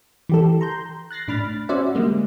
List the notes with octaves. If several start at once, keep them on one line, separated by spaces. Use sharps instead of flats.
E3 G4 A4
A#5 C6 G6
F#6 A6 A#6 C7
A2 D4 B5 F6 A6
C#4 F#4 C5 D5 E5 F#5
D3 G3 G#3 A#3